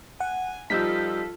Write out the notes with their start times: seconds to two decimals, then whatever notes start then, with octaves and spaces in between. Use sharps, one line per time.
0.20 F#5 G#5
0.70 F3 G3 D#4 F4 A4 E6 G6 B6